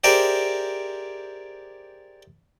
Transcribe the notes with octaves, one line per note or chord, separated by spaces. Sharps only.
G4 G#4 A#4 C5 D5 E5